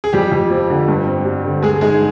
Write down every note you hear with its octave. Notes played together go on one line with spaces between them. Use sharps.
G#4
F2 G3 G4
F2
F3
D3
G2
C4
G3
D3
G2 G#3 G#4
G#3 D#4 G#4